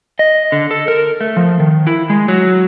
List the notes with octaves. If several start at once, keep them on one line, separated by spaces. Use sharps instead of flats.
D#5
D3
A4
A#4
A3
F3
D#3
E4
G#3
F#3